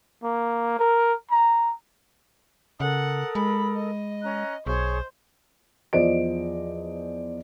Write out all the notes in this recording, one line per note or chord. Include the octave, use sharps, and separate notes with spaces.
A#3
A#4
A#5
C#3 A4 A#4 F#5 D#6
G#3 B5
D#5
C#4 A#5 F#6
B1 G#4 C5 C#5 C#6
E2 F3 C5 D5 D#5 D7